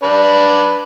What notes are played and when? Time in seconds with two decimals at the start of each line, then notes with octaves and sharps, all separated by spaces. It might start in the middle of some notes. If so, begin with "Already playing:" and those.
0.03 D4 B4 D5